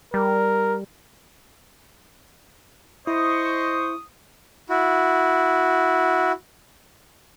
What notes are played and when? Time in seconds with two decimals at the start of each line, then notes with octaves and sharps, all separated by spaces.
0.14 G3 A#4
3.07 E4 C5 D#5 C#6 D#6
4.69 E4 F#4